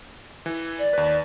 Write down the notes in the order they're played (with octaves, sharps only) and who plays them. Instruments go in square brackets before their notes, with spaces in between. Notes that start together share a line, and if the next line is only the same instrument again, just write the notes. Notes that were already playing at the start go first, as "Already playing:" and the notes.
[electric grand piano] E3
[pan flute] D5
[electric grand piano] D#2 B4